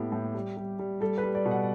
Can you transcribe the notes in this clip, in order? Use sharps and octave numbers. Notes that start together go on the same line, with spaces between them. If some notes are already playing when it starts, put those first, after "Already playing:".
Already playing: A2 B3 G4
A2
G3
G3
G3
G3 A4
B4
G3
D5
B2
F#5